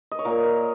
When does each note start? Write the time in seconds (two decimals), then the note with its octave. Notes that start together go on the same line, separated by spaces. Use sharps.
0.12 D#5
0.19 C#5
0.25 A#2 A#4